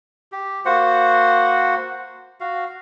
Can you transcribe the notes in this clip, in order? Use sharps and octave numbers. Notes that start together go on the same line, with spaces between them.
G4
A#3 F#4 C5 F#5
F#4 F5